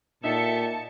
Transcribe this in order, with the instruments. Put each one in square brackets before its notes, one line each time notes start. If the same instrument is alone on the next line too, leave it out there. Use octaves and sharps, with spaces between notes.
[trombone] A#2 [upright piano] D#4 [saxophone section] G4 A4 E5 [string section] A5 C#7